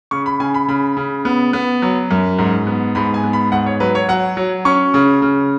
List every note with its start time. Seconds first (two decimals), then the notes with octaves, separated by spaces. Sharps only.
0.11 C#3 C#6
0.26 B5
0.40 C#3 G#5
0.54 B5
0.68 C#3 B5
0.97 C#3
1.25 B3
1.53 B3
1.82 F#3
2.11 F#2
2.38 G#2
2.67 B3
2.95 G#2 B5
3.14 G#5
3.24 B3
3.33 B5
3.52 G#2 F#5
3.66 C#5
3.80 F#3 B4
3.95 C#5
4.08 F#3 F#5
4.37 F#3
4.65 C#4 C#6
4.94 C#3
5.22 C#3